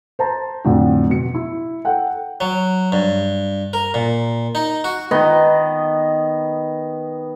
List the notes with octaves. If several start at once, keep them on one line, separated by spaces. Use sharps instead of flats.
C5 A5 A#5
F2 A2 D3 F#3
B2 C#7
E4
A4 F#5 G5
F#3
G2
A#4
A#2
D#4
F#4
D#3 B3 D#5